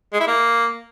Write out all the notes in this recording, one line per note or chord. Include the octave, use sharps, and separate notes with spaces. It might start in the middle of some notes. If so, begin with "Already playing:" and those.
G#3
E4
A#3